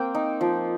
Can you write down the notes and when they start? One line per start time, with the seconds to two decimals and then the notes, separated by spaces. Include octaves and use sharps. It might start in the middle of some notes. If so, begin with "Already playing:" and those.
Already playing: A#3 C4 G5
0.15 D#4
0.41 F3